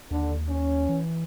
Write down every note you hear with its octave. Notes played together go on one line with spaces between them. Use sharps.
D#2 D3
C#4
E3